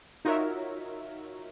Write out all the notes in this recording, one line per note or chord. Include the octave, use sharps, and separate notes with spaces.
D#4 F4 F#4 A#4 C#5 E5